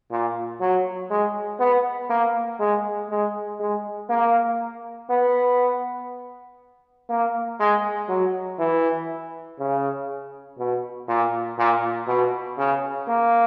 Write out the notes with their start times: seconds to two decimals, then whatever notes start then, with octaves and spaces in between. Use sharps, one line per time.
0.11 A#2
0.60 F#3
1.11 G#3
1.60 B3
2.10 A#3
2.60 G#3
3.10 G#3
3.60 G#3
4.10 A#3
5.10 B3
7.10 A#3
7.60 G#3
8.09 F#3
8.58 E3
9.59 C#3
10.59 B2
11.08 A#2
11.58 A#2
12.08 B2
12.58 C#3
13.08 A#3